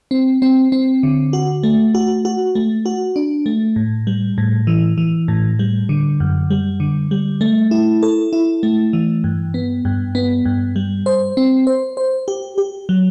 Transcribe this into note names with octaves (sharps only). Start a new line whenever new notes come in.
C4
C4
C4
D3
F#4
A3
F#4
F#4
A3
F#4
D4
A3
A2
G3
A2
E3
E3
A2
G3
D3
F#2
G3
D3
G3
A3
E4
A4
E4
A3
E3
G2
B3
G2
B3
G2
G3
C5
C4
C5
C5
G4
G4
F#3